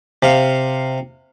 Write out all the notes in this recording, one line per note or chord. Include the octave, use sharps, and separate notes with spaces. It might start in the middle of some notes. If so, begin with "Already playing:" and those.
C3 F5